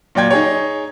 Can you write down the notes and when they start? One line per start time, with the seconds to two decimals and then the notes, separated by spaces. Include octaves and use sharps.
0.15 A#2 F#3 D5 G5 G#6
0.31 D#4 G#4 C#5